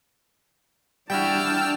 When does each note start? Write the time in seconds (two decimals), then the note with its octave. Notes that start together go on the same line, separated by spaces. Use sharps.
1.10 G3 D4 E4 F#4 G5 A5 E6 F6